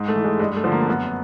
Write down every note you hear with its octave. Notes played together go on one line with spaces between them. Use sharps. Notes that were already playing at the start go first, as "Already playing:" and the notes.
Already playing: G#2
A3
E3
G#3
G2 G#3
A3
D3 F3
A#3
F#2 B3